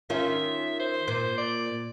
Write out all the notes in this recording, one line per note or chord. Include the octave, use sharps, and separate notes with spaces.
D#3 C#4 F4 E5
C5
A#2 C5
D5